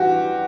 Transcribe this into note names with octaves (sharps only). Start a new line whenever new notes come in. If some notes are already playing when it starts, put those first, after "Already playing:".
Already playing: G2 E3 F#4 G4